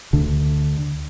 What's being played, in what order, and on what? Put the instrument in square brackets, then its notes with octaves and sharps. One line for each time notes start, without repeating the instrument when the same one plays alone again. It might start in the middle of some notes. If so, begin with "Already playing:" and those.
[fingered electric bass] D2 D3